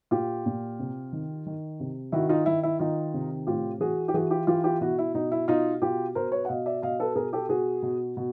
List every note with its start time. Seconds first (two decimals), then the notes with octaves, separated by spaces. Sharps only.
0.11 A#2 F4 G4
0.46 A#2
0.79 C3
1.13 D#3
1.46 D#3
1.80 C3
2.12 D#3 E4 F#4
2.29 D#4 F4
2.46 D#3 E4
2.63 E4
2.79 D#3 D#4 F4
3.14 C3
3.47 A2 F4 G4
3.80 E3 F#4 G#4
4.08 G4
4.14 E3 F#4 G#4
4.31 F4 G4
4.47 E3 F4 G4
4.64 F4 G4
4.81 B2 E4 F#4
4.99 E4
5.14 B2 D#4
5.32 E4
5.48 B2 D#4 F4
5.81 B2 F4 G4
6.15 B2 A#4 C5
6.32 B4 C#5
6.45 F#5
6.48 B2 D#5 F5
6.66 D5 E5
6.82 B2 D#5 F5
6.99 A4 B4
7.15 B2 G#4 A#4
7.33 G4 A4
7.49 B2 F#4 G#4
7.83 B2
8.17 B2